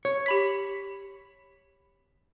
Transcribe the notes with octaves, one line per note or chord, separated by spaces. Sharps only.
C#5
G4 B5 B6